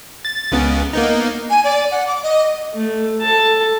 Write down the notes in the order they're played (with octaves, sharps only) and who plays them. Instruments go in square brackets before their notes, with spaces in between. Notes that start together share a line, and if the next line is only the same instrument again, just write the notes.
[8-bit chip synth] A6
C#2 C#3 B3
A#3 B3 D#4
[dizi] G#5
D5
F#5
D6
D#5
[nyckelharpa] A3
A4 A5